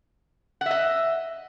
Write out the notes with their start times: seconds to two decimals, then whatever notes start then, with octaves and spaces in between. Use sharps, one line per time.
0.61 F#5
0.66 E5
0.71 D#5